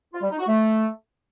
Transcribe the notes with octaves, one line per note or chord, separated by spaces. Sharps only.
F4
G3
D#4
F#4
A3